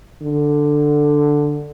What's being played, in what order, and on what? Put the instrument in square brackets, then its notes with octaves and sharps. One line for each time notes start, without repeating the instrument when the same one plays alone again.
[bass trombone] D3